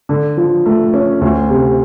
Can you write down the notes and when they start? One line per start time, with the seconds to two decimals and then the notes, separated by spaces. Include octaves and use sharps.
0.09 D3
0.37 F3
0.66 A3
0.94 C#4
1.21 D2
1.50 C3